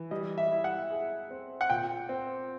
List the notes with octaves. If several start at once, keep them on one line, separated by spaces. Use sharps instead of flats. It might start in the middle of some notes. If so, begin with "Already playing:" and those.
Already playing: E3
G3 D#5
E5
E4
F#5
G#4
C4
F#5
A#2 G5
C4